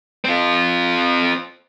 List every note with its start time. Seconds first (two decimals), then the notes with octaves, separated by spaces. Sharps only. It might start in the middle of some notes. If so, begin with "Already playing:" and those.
0.25 C4 F4